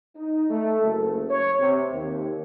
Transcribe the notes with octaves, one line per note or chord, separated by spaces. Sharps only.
D#4
A3
F#1
C#5
C3
D#2